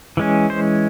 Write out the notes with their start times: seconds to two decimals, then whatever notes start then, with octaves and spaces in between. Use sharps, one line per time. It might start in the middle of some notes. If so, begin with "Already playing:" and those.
0.17 E3 G#3 C#4
0.50 C5